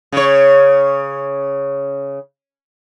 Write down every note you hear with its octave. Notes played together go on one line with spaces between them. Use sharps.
C#3 C#5